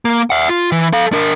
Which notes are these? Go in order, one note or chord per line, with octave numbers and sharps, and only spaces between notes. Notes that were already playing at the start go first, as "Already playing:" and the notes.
A#3
E5 F#5
F4
E3
A4 F5
D4 A#4